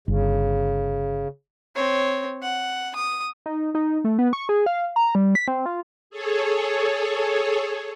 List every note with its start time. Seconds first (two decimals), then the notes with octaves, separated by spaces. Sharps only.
0.08 G1 C#3
1.76 C4 C#5
2.42 F#5
2.96 D#6
3.46 D#4
3.75 D#4
4.04 A3
4.19 B3
4.33 C#6
4.49 G#4
4.66 F5
4.96 A#5
5.15 G3
5.35 B6
5.48 C4
5.66 F4
6.10 G#4 A4 C#5